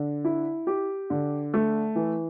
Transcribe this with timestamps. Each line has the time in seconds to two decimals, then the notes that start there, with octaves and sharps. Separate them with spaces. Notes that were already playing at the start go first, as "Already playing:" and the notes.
Already playing: D3
0.25 E4
0.67 G4
1.10 D3
1.54 A3
1.95 E3